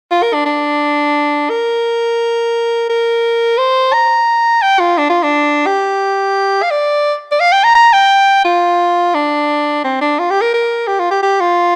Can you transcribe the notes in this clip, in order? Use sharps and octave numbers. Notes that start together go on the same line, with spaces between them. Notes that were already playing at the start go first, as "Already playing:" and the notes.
F4
A#4
D4
D4
A#4
A#4
C5
A#5
G5
F4
D4
F4
D4
G4
F5
D5
D5
F5
G5
A#5
A#5
G5
F4
D4
C4
D4
F4
G4
A#4
A#4
G4
F4
G4
G4
F4